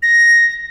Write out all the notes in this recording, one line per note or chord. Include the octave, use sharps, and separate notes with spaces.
A#6